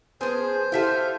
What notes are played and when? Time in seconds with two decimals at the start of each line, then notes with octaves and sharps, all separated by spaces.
0.21 F3 B3 G#4 C5
0.72 E4 F4 G4 A4 E5 F5